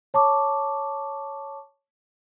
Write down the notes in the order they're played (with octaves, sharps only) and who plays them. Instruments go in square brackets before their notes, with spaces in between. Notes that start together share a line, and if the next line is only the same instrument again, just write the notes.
[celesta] C#5 A5 C#6 D6